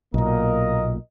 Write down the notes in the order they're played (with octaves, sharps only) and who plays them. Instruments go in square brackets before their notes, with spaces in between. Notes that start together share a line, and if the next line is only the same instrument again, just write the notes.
[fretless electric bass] B1 A#2 [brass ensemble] A#3 A#4 D#5